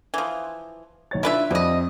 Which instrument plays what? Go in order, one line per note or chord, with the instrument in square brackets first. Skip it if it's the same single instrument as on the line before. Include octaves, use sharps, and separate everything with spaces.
[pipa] E3 F3
[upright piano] B1 C#5 A6
[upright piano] D4 F4 [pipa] E4 B4 E5
[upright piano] F2 C4 [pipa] G3 D#5